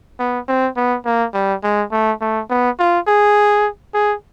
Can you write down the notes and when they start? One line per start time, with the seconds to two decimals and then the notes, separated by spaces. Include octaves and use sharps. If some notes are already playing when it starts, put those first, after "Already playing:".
0.19 B3
0.48 C4
0.76 B3
1.05 A#3
1.34 G3
1.63 G#3
1.92 A3
2.21 A3
2.50 B3
2.79 F4
3.07 G#4
3.94 G#4